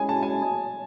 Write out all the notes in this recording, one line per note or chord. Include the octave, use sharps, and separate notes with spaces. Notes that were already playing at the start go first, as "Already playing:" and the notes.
Already playing: G#3 C#4 E4 G#4 C#5 G#5
A5
G#5